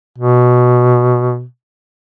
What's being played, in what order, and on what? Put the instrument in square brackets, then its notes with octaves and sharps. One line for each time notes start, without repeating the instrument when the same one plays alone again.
[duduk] B2